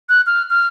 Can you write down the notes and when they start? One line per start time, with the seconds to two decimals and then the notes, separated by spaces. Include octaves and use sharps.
0.09 F#6
0.27 F6
0.50 F6